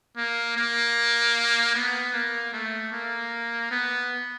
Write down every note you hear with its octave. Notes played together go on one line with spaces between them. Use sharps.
A#3
A#3
B3
A#3
A3
A#3
B3